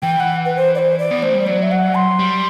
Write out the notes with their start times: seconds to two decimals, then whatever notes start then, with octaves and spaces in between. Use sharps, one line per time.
0.02 E3 G5
0.20 F#5
0.45 B4
0.56 C5
0.75 D5
0.79 C5
0.99 D5
1.11 B3
1.22 A3 C5
1.34 G3
1.47 F#3 D5
1.63 E5
1.71 F#5
1.95 C6
2.19 G3